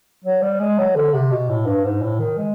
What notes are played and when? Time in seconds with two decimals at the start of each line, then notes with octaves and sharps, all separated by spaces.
0.25 F#3
0.42 G3
0.60 G#3
0.78 F#3
0.96 D3
1.14 C3
1.31 B2
1.49 A2
1.66 G2
1.85 G#2
2.02 A2
2.20 D#3
2.38 G#3